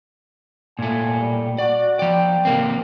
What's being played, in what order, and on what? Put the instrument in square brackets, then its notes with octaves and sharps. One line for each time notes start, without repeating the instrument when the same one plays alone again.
[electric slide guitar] A#2 A3 [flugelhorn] G#5
[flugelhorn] G3
[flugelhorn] F#4 [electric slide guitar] D5
[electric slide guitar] F3 D5 [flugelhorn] G5
[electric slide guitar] C3 A#3 C4